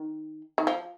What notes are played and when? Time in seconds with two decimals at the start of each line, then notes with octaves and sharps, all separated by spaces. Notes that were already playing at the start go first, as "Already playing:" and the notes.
Already playing: D#3
0.58 D#3
0.67 F3